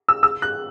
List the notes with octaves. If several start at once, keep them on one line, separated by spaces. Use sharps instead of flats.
E6
E6
F#6